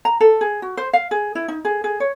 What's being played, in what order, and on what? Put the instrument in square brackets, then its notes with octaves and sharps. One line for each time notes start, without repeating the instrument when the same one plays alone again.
[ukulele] A#5
A4
G#4
F#4
C5
F5
G#4
E4
D#4
G#4
G#4
C#5